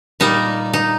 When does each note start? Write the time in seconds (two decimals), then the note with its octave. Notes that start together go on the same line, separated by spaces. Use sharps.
0.20 A#2 G3 A#3 D#4
0.73 D#4